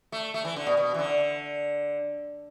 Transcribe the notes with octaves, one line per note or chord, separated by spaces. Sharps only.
A3
A3
E3
D3
B2
B2
E3
D3